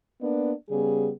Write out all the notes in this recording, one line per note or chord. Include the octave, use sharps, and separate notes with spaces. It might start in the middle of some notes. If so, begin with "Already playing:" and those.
A#3 B3 D4 D5
C#3 G3 B3 G#4